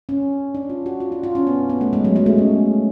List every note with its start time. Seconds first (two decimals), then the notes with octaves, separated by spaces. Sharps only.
0.09 C#4
0.55 D4
0.69 F4
0.86 F#4
1.00 F4
1.12 D4
1.23 F4
1.35 C#4
1.47 B3
1.69 B3
1.81 A3
1.93 G#3
2.04 F#3
2.16 G#3
2.26 A3
2.38 C#4